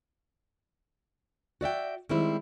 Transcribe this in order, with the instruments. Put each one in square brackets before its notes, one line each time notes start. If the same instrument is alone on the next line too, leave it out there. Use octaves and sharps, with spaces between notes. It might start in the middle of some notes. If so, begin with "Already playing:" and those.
[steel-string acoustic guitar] F#4 D5 E5 G5
D#3 G3 G#3 C4 E4